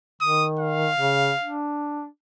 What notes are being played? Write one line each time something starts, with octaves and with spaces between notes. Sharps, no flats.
D#3 D#6
F5
C#3
D4